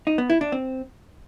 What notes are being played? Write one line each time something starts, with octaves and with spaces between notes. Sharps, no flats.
D#4
B3
E4
D4
C4